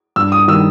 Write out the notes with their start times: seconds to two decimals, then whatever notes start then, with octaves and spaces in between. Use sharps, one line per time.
0.16 G2 E6
0.32 D#6
0.48 D#3 G3 E6